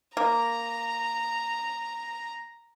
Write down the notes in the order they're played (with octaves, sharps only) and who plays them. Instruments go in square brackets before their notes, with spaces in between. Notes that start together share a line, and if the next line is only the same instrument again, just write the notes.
[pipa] A#3 [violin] A#5